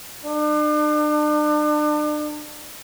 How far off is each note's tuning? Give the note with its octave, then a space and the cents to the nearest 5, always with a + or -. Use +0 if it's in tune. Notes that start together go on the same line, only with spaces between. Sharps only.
D4 +40